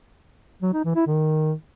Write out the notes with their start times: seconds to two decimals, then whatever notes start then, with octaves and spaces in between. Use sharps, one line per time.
0.62 F#3
0.74 D#4
0.85 E3
0.96 E4
1.07 D#3